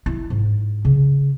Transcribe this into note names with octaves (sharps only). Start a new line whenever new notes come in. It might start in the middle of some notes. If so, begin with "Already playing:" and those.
E4
G#2
C#3